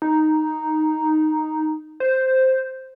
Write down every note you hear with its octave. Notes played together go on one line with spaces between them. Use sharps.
D#4
C5